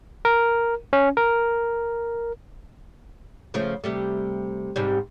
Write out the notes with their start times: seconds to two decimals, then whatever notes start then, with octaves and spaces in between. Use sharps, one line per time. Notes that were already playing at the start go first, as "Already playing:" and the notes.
0.25 A#4
0.93 C#4
1.17 A#4
3.54 C#3 F3 A3
3.84 C3 G3 A3
4.76 G#2 C3 G3